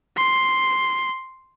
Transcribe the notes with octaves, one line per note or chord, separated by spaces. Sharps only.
C6